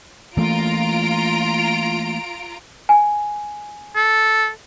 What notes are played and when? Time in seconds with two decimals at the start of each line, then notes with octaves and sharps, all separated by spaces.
0.37 E3 A3 A#3 F4 A#5 D7
2.89 G#5
3.96 A4